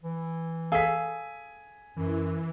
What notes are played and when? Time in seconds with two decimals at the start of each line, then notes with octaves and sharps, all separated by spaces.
0.03 E3
0.72 G#4 A4 F5 G#5 B6
1.96 F#2 E3